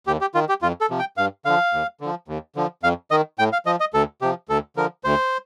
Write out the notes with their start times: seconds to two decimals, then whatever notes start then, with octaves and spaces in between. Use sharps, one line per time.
0.07 D#2 G4
0.21 G4
0.34 D#3 F4
0.49 G4
0.62 F2 F4
0.81 A4
0.90 C3 F3
0.99 G5
1.17 G2 F5
1.45 D3 F3 F5
1.73 D#2
2.01 D3 F3
2.28 D#2
2.56 D3 F3
2.83 F2 F5
3.11 D#3 D#5
3.39 A2 G5
3.53 F5
3.66 F3 D#5
3.80 D#5
3.94 D2 A4
4.22 C3 F3 G4
4.49 D2 A4
4.76 D3 F3 A#4
5.04 D2 C5